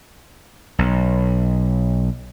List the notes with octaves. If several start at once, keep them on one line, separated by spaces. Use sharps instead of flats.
B1